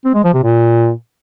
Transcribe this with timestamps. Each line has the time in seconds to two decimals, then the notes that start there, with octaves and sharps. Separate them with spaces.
0.05 C4
0.15 G#3
0.24 F3
0.34 C3
0.44 A#2